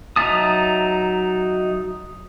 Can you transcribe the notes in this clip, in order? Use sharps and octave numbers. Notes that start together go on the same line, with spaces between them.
F#3 D#4 E5 A5 D#6